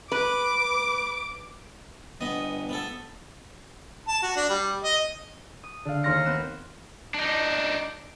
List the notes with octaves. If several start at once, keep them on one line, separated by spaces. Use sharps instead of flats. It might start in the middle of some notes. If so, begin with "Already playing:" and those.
B4 D6
G1 B3 D#5
B3 A4
A5
F#4
D4
G3
D#5
D#6
D3 F5
D#2 C6 F6 A#6 C#7
B3 C4 F#6 E7
D4 D#4